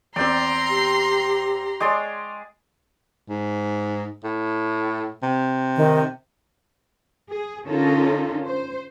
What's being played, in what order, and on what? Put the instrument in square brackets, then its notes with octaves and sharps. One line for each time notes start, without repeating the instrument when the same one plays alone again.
[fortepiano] E2 C4 [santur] D5 G5 [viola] A#5 C6
[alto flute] G4
[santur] G#3 G#4 D5 [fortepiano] C#5 C6 D6
[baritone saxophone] G#2
A2
C3
[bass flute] D#3
[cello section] G#4
D3 C#4 D#4 F4 A4 A#4
C5